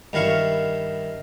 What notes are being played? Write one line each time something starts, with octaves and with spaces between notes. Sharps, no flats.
G2 D#3 E4 F5 C#6